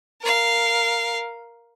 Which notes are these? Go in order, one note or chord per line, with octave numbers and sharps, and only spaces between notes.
A#4 F5